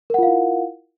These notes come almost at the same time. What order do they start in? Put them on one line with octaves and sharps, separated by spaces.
A#4 F#5 F4 F5 E4